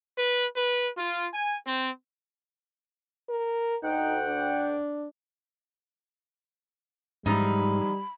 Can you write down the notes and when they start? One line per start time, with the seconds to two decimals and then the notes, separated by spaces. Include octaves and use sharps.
0.18 B4
0.56 B4
0.97 F4
1.33 G#5
1.67 C4
3.29 A#4
3.83 D2 D#4 F#5 G5
4.26 D4
7.26 G#2 E3 F3 G3 D#4 B5